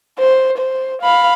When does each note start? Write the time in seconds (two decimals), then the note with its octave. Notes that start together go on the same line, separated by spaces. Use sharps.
0.19 C5
0.58 C5
1.02 F5 B5